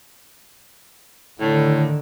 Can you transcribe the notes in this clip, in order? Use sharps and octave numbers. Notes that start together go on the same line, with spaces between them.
A2 D3 D#3